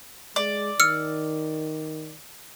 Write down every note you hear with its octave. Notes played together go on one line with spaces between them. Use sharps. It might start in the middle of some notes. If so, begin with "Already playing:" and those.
G#3 D5
D#3 E6 F6 C#7